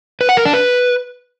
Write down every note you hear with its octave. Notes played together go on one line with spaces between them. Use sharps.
B4
F#5
A#4
D4
B4